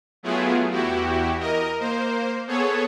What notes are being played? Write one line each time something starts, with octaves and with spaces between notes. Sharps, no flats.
F#3 A3 B3 E4 F4 G#4
E2 E4 F#4 G4
A#4 D#5
A#3 C5
B3 G#4 A4 C#5